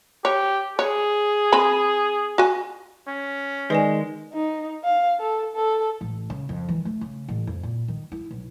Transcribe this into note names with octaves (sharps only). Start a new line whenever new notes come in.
G4 C#5
G#4 C#5
C4 G#5 B5
F#4 G#5
C#4
D#3 G#3 B4 D5 G#5
D#4
F5
A4
A4
A1
C#3
F2
E3
A3
C#3
A1
F2
A#2
D#3
E4
B1